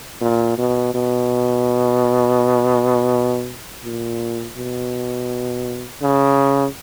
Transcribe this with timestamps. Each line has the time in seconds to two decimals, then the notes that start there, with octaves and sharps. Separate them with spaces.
0.21 A#2
0.58 B2
0.94 B2
3.84 A#2
4.57 B2
6.02 C#3